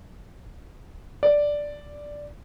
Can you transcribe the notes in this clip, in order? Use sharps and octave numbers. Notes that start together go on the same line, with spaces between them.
D5